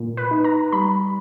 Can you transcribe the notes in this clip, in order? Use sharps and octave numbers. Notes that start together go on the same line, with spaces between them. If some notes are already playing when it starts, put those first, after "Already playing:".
Already playing: A#2
B4
D#4
A#5
G3 B5